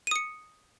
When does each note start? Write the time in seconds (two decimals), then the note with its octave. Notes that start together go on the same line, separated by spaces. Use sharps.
0.07 D#7
0.11 D#6
0.16 C#7